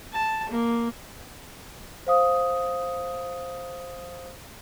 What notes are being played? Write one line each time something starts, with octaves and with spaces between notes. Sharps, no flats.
A5
A#3
C5 F5 D#6